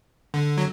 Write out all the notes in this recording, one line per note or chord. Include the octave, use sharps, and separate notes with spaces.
D3
F#3